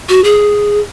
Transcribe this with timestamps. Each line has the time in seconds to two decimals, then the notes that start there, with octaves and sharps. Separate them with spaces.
0.09 F#4
0.24 G#4